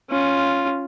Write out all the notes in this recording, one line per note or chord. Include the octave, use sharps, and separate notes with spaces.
C#4 F4